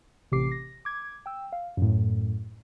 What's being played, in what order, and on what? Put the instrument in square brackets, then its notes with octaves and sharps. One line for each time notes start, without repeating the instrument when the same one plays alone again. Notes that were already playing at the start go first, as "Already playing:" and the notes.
[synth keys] A1 C3 G4 D6 C7
A#6
D6 G#6
G5 E6
F5
F#2 A2